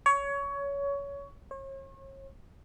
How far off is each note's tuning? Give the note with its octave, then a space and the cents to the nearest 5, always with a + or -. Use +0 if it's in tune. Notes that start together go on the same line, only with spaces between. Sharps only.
C#5 +20
C#5 -40